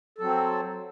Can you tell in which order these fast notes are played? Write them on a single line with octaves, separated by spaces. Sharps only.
A4 F#3 C4